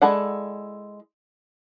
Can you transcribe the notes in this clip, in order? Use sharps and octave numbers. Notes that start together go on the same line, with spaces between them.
G#3 E4 A4 D5 F#5